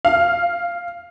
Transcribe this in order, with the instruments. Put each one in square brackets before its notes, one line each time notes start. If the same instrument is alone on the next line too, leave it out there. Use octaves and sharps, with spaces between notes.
[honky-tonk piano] F5